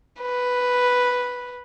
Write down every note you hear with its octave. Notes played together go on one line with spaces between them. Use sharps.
B4